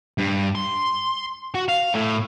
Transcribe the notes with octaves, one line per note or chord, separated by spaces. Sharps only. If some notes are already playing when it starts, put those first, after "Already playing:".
G2
C6
F#4
F5
A2